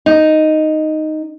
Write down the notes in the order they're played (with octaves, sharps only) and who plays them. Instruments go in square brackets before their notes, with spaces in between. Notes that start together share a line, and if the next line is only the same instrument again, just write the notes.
[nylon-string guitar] D#4